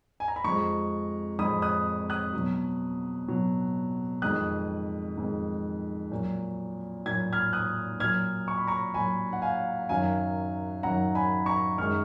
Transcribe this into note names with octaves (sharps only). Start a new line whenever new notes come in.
G#5
A#5
B5
F2 F3 G#3 A#5 C#6
F2 F3 G#3 B5 D#6
D#6 F#6
D#6 F#6
B2 F#3
B2 F#3
F2 D#3 G#3 D#6 F#6
F2 D#3 G#3
A#2 F#3
A#2 F#3 G#6
F6 G#6
D#6 F#6
A#2 F#3 F6 G#6
C#6
B5
A#5 C#6
A#2 F#3 G#5 B5
F#5
F5 G#5
F#2 D#3 F#3 F5 G#5
F#2 D#3 F#3 F#5 A#5
G#5 B5
A#5 C#6
F#2 D#3 G#3 C#6 F6